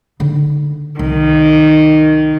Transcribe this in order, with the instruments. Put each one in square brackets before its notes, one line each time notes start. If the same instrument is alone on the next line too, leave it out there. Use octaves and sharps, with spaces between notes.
[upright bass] D3 D#4
[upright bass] C2 [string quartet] D#3